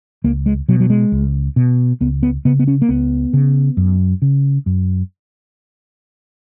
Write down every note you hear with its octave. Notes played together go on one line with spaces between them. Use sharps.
C#2 A#3
G#3
B2 F#3
F#3
G#3
C#2
B2
C#2 B3
B3
C#3 B3
B3
C#4
A#3
C#2 B3
C#3
F#2
C#3
F#2